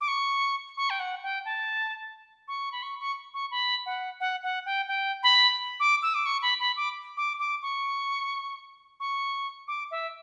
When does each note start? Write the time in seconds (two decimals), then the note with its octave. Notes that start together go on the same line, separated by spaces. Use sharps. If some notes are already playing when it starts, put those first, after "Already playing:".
0.01 D6
0.08 C#6
0.77 C#6
0.90 G5
1.00 F#5
1.23 G5
1.45 A5
2.48 C#6
2.72 B5
2.83 C#6
3.00 C#6
3.34 C#6
3.51 B5
3.86 F#5
4.20 F#5
4.43 F#5
4.66 G5
4.88 G5
5.23 B5
5.80 D6
6.02 E6
6.15 D6
6.26 C#6
6.42 B5
6.60 B5
6.77 D6
7.17 D6
7.39 D6
7.62 C#6
9.00 C#6
9.68 D6
9.91 E5